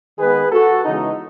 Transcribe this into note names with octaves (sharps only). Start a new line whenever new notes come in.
D#3 G#3 B3 G#4 B4
F#4 A4
C#3 E3 G#3 B3 D#4